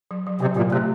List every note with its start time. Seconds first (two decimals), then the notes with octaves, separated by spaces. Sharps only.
0.11 F#3
0.27 F#3
0.41 C3 F#3
0.57 A#2 F#3
0.72 C3 A3